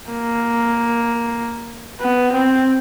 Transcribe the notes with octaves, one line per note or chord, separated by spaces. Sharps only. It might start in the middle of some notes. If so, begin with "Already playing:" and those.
A#3
B3
C4